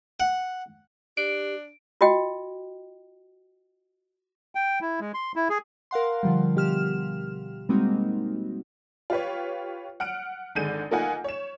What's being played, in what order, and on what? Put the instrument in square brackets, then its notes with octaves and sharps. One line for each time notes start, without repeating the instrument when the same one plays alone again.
[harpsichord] F#5
[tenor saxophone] D4 [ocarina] G4 [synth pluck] D7
[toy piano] F4 F#4 D#5 G5
[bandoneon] G5
E4
G#3
C6
E4
G#4
[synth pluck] A#4 F5 F#5 C6
D3 F3 G3
B2 G4 F6 E7
G3 G#3 A#3 C4 D#4 F#4
[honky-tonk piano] F4 G4 B4 C#5
F#5 F6 D7
G#1 D3 G#3 G6 D#7
A3 A#3 D#4 F4 F#5 G#5
C#5 E7